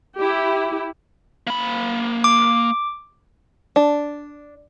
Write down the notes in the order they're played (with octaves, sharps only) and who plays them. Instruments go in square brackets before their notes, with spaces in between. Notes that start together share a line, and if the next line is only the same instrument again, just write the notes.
[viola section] E4 G4
[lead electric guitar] A#3 B5
[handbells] D6
[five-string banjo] D4